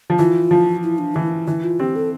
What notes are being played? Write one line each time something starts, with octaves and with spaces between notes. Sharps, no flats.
F3
E3 F4
F3
E4
D4
E3 E4
E3 E4
F4
C4 G4
A4